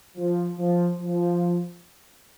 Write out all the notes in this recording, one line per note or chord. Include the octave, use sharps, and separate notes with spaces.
F3
F3
F3